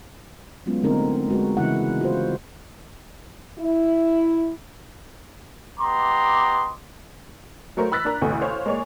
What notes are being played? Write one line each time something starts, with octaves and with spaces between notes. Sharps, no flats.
F#3 G#3 B3 C#4 F4
D3 A3 B3 C4 D#4 A#4
G#3 F#4 B4
C#3 E3 E4 F#5
F4 F#4 C5
E4
B3 G4 D#5 A#5 C6 D6
F#3 A3 A#4 C5
B5 E6 F#6 A6 B6
D4 A#4 A#5
A1 D2 B2 A3
C5 C#5 F5
G#3 A#3 G#4 C#5 D5